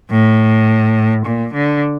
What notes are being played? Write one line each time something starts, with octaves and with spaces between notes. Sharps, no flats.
A2
A#2
D3